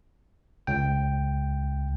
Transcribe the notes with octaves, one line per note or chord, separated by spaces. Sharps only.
C#2 G5